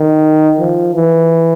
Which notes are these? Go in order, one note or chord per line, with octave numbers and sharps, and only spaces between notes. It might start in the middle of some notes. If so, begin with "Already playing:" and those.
Already playing: D#3
F3
E3